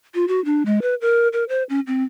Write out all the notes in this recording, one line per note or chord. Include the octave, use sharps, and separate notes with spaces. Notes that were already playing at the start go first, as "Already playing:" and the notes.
F4
F#4
D4
G#3
B4
A#4
A#4
C5
C#4
C4